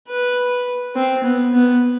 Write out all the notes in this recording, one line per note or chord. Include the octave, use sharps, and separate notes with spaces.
B4
C4
B3
B3